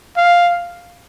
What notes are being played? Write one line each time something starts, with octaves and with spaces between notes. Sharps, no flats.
F5